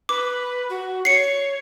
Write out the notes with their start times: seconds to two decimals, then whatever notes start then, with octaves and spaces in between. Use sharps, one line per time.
0.09 B4 D6
0.69 F#4
1.05 C#5 C7 C#7